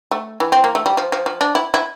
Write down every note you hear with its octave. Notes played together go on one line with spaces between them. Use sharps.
A3
E3
C4
A#3
A3
G3
F3
F3
F3
D4
E4
E4